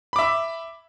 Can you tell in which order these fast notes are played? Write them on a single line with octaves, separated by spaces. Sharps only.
B5 D6 E5